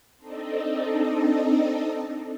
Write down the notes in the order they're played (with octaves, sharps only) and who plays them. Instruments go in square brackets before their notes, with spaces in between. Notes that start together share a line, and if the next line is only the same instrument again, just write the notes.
[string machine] C4 D4 D#4 A4 D#5